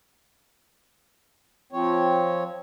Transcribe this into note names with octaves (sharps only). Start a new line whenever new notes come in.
F3 C4 C#5